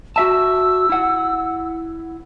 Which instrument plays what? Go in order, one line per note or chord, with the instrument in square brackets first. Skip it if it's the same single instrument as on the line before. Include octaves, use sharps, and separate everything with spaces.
[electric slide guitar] F#4 E5 A5 [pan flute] E6
[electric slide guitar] E4 F#5